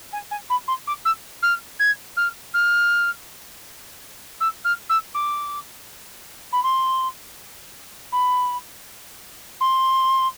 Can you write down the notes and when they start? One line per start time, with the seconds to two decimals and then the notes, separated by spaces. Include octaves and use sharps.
0.12 G#5
0.31 G#5
0.50 B5
0.68 C6
0.87 D6
1.05 E6
1.42 F6
1.79 G#6
2.17 F6
2.54 F6
4.40 E6
4.64 F6
4.89 E6
5.14 D6
6.52 B5
6.63 C6
8.12 B5
9.60 C6